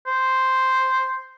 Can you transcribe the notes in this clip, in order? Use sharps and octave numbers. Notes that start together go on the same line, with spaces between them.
C5